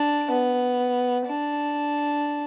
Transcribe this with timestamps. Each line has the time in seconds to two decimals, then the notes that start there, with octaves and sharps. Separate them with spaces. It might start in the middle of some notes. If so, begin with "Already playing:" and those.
Already playing: D4
0.30 B3
1.27 D4